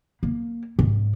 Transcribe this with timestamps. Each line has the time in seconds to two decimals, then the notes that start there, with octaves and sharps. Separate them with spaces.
0.23 A#3
0.79 G#2